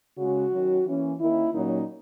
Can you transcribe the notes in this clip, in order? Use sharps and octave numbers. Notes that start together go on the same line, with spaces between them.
C#3 G#3 C#4 F#4
D#3 F#3 C#4
E3 A#3 C#4
D#3 A#3 C#4 E4
A#2 F#3 A#3 C#4 D#4